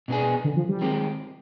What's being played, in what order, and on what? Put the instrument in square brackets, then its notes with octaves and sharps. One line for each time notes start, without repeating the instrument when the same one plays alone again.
[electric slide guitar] B2 B3 D4 G#4
[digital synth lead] D3
F3
G3
[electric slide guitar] D#3 G#3 C4 G4